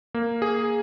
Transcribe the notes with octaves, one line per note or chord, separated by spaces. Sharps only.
A#3
G#4